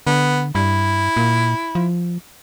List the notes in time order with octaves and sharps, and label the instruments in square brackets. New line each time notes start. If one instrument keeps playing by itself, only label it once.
[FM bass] D3 [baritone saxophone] B3
[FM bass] G2 [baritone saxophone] E4
[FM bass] A#2
F3